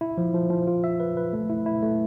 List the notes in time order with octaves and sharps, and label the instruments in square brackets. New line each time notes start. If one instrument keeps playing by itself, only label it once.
[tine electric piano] E4
F3
F3
F3
F4
E5
B4
B4
A3
E4
E4
A3